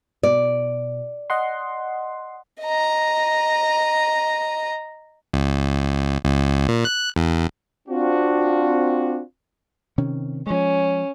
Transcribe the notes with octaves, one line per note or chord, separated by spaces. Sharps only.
B2 D5
D#5 F#5 C6
D#5 A#5
C#2
C#2
A#2
F#6
E2
C4 D4 F4 F#4
C3 D#3 C#4
F3 G#3 C#4